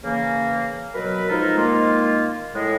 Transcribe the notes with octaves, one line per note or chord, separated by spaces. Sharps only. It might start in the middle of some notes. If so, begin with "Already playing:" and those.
C#3 E3 A#3
B2 F#3 A#4 B4 B5
F3 G#3 D#4 A4 A#4
D#3 G#3 A#3 F4
A2 G#3